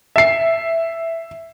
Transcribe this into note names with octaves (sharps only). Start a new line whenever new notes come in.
E5 C7